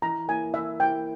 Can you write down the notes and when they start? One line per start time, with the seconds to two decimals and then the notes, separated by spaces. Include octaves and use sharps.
0.02 E3 A#5
0.28 A#3 E4 G#5
0.54 E3 E5
0.80 A#3 E4 G5